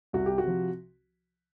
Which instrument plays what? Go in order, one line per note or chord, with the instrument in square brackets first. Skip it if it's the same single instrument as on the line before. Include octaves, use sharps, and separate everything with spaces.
[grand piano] C2 F#4
G4
F#4
C3 F3